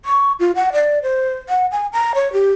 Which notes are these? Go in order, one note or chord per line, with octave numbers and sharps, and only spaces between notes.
C#6
F4
F#5
D5
C5
F#5
G#5
A#5
C#5
G4